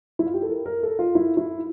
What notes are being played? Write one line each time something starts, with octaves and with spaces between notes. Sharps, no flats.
E4
F4
G4
A4
A#4
A#4
A4
F4
E4
E4